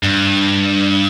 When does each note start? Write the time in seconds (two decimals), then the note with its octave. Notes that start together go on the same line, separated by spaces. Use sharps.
0.03 G2